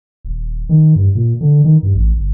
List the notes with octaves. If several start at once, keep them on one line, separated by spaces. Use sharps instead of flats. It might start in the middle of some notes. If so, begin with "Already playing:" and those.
D#1
D#3
G2
A#2
D3
D#3
G2
A1
G1